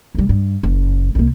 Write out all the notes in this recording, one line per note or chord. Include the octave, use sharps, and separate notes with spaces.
F1 G3
G2
F#1
C2 A#3